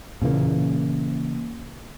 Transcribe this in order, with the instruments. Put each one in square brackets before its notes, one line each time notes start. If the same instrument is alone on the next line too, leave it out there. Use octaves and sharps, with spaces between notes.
[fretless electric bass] A#2 C#3 E3 A#3